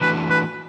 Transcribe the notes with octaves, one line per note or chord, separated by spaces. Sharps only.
E3 A3 D4 F#4 B4
B4